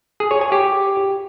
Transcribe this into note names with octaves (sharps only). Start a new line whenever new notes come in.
G#4
C#5
G#5
G4